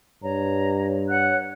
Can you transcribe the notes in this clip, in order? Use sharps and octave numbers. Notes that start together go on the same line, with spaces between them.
G2 C#5 A#5
C#5 F#5 F#6